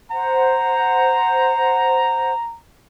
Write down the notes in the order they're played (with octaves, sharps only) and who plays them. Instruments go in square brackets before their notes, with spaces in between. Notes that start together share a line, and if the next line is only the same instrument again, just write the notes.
[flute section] C5 F#5 [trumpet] A#5